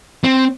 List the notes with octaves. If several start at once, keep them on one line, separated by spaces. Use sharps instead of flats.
C4